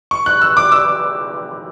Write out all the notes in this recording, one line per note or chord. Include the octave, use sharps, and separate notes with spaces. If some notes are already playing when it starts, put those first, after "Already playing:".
C#6
F#6
E6
D6
E6